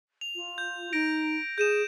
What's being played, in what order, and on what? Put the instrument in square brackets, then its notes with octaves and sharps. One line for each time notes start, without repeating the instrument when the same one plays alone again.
[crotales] F7
[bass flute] F4
[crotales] G6
[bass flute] D#4 [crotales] A#6 D7
[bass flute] G#4 [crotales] G6 D#7 E7